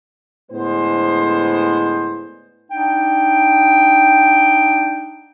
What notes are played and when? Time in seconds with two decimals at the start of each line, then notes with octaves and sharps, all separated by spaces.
0.52 A2 D3 G#3 B3 C5
2.71 D4 D#4 F#5 G5